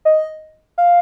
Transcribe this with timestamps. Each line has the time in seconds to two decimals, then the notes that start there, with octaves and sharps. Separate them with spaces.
0.05 D#5
0.78 F5